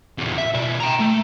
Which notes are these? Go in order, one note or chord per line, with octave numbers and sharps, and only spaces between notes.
E2 A#2
E5
B2 D5
G5 A#5
A3